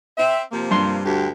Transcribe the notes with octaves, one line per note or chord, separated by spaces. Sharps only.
C4 E5
C3 F3 A#3
G2 C6
D2 G4